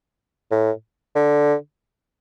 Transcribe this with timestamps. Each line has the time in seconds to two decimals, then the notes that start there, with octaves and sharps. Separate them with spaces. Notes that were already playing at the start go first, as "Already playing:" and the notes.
0.51 A2
1.15 D3